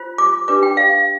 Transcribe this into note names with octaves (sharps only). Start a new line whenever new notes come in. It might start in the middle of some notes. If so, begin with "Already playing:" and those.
Already playing: F4 C5
D6
D4 G4 B4 D6
G5
F5